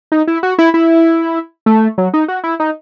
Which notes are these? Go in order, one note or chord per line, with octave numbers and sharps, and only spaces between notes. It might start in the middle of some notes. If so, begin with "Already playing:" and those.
D#4
E4
F#4
E4
E4
A3
F#3
D#4
F#4
E4
D#4